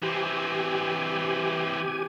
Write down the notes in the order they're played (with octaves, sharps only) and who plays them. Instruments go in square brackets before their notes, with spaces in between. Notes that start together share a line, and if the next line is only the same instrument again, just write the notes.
[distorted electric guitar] E3 C4 [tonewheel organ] G4 G#5